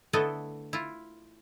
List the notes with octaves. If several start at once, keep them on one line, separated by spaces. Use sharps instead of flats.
D3 A3 B3 E4 A4 D#5
E4 F4